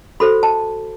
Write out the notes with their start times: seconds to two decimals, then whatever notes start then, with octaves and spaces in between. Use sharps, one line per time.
0.20 F#4 A4 C5 B5
0.43 A5